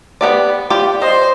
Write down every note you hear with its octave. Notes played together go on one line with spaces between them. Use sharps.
B3 G4 D5
F4 G4 D5
C5 D#5